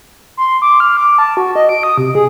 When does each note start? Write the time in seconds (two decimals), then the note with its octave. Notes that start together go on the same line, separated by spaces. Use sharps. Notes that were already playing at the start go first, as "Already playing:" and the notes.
0.37 C6
0.62 D6
0.80 F6
0.97 D6
1.18 A5
1.37 F#4
1.56 D#5
1.69 D7
1.83 D#6
1.98 C3
2.15 G#4